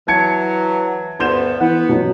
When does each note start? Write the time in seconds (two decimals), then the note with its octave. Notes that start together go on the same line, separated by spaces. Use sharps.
0.08 E3 F#3 A5 G#6 C#7
1.20 D2 G2 B3 C6 G6 E7
1.61 E3 B3
1.89 B2 F#3